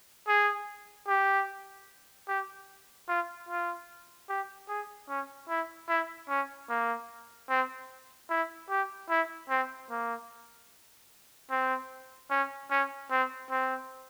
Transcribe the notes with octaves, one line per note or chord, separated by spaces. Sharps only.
G#4
G4
G4
F4
F4
G4
G#4
C#4
E4
E4
C#4
A#3
C4
E4
G4
E4
C4
A#3
C4
C#4
C#4
C4
C4